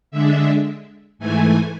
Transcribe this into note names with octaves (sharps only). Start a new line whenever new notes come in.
D3 G#3 D4 E5
G#2 E3 A3 G#5